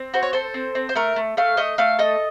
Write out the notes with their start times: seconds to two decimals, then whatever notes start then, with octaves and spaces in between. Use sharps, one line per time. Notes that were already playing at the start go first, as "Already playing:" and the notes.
Already playing: C4
0.14 F#4 C5
0.23 C#5
0.33 A4 C5
0.54 C4
0.75 C4
0.89 C5
0.95 A3 A#4
1.16 A3
1.37 A3 F5
1.57 A3 D#5
1.78 A3 F5
1.99 A4 D#5